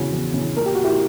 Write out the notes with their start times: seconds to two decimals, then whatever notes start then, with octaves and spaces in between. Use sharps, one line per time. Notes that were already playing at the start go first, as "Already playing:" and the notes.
Already playing: E2 C#3 E3 F#4
0.12 E2
0.34 C#3 E3
0.56 A#2 A#4
0.66 G4
0.75 F#4
0.84 E4 G4